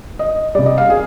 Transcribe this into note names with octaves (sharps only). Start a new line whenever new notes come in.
D#5
C3 G3 D5
D#5
F5
G#4